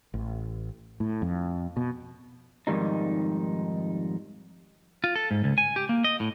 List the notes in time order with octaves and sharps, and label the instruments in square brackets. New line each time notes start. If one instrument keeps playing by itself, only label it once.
[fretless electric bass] A1
A2
F2
B2
[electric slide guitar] F2 G#2 D#3 G3 D#4
[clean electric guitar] F4
A4
G#2
C#2
G#5
G4
A#3
D#5
A2